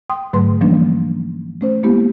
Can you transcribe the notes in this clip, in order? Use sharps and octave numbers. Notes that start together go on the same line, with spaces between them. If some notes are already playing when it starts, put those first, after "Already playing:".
G5 C6 D#6
G#2 D3 F#3 A3 B4 C6
E3 F3 G3 A#3 C#4 D4
A3 C#4 C5
G#3 A#3 B3 E4 G4